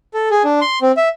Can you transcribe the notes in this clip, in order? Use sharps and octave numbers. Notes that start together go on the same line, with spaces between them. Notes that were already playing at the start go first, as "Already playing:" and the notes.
A4
G#4
D4
C6
C4
E5